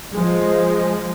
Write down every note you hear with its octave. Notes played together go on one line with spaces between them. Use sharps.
F3 G#3